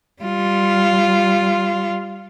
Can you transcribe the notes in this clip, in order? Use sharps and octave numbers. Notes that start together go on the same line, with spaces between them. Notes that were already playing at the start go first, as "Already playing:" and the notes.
G3 F4